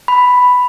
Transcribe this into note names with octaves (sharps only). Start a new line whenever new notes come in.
B5